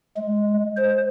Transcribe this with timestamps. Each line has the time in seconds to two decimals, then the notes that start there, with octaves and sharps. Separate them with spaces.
0.16 G#3
0.77 C5